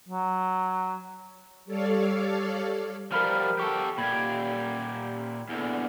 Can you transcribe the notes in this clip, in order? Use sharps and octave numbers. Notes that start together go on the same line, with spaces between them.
F#3
G3 A4 C#5 D5 F5
F3 G3 A#4 B5 F6
G4 A4 C#6
A#2 G4 B5 G#6
E2 D3